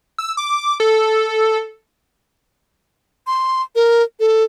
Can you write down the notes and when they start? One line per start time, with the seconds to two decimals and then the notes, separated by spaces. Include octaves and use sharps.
0.18 E6
0.37 D6
0.80 A4
3.27 C6
3.75 A#4
4.20 A4